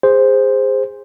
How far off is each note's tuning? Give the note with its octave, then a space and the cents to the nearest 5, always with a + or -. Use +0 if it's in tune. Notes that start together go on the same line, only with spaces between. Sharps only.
G#4 -25 C5 +0